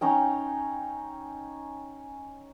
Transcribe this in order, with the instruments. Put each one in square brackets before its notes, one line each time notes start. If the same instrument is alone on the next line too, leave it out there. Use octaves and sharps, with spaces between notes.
[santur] C#4 D#4 G5